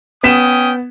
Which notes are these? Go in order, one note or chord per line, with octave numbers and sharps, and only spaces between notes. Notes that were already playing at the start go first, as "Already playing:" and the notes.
B3 C#4 G5 D#6 B6 E7